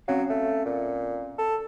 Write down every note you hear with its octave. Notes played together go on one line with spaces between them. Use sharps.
F#3 C4 C#4 F5
A3
A#2
A4